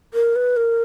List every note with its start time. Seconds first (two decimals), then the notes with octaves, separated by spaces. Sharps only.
0.14 A#4
0.36 B4
0.57 A#4